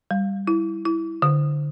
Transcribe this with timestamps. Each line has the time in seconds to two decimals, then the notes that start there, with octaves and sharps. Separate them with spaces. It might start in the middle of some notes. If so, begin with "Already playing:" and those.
0.11 G3
0.47 E4
0.85 E4
1.22 D3